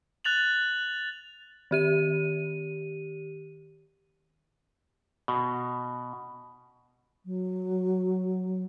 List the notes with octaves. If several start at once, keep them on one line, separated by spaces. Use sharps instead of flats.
F#6 A6 F7 F#7
D#3 G4 D#7
B2
F#3